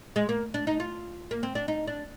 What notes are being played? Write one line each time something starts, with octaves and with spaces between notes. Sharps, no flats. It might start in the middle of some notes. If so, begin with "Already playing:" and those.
G#3
A#3
D4
D#4
F4
A#3
C4
D4
D#4
D4